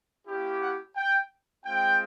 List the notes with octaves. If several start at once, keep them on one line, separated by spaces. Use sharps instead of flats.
A#3 C#4 E4 G4
F#5
G5
G#3 C4 F4 G5